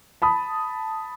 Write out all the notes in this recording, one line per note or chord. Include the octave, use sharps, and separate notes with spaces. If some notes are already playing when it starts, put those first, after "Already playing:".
A5 B5 D#6